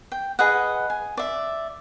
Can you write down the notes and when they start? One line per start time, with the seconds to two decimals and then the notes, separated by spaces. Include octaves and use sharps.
0.12 G5
0.39 G#4 B4 D#5 F#5
0.90 G#5
1.17 D5 E5